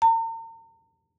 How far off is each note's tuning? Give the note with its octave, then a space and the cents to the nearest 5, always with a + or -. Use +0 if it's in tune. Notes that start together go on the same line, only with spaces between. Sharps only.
A#5 -45